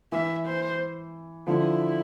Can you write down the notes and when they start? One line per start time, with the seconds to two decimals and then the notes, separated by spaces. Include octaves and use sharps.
0.12 E3 E5
0.46 C5
1.47 D3 F3 E4